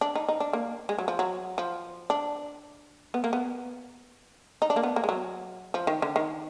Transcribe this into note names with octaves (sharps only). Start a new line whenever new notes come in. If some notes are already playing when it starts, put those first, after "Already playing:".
D4
D#4
D#4
D4
A#3
G#3
F#3
F3
F#3
F3
D4
B3
A#3
B3
D#4
D4
A#3
B3
A#3
G#3
F#3
F3
D#3
D3
D#3